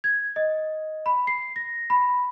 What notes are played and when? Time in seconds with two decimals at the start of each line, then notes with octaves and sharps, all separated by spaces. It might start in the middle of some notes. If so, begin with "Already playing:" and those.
0.04 G#6
0.36 D#5
1.06 B5
1.27 C7
1.56 A#6
1.90 B5